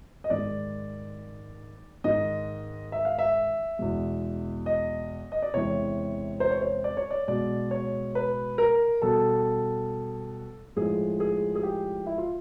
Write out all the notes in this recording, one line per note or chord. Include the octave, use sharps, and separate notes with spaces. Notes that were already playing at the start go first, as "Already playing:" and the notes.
D#5
G#2 D#3 G#3 D5
G#2 D#3 G#3 D#5
E5
F5
E5
E2 B2 G#3
D#5
D#5
D5
E2 C3 E3 G#3 C#5
C5
C#5
C5
D5
C#5
D5
B2 G#3 D5
C#5
B4
A#4
B2 G3 A4
A2 F3 G#3 G#4
G#4
G#4
G4
E4
F4